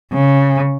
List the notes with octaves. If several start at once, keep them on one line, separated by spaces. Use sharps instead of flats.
C#3